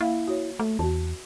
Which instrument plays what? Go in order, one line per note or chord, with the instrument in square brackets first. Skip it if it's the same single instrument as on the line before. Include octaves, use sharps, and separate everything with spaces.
[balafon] A#3 F5 [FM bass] E4
[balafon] F#4 C#5
[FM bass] A3
[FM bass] E2 [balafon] F#4 A5